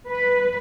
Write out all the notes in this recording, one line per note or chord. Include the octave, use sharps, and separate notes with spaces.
B4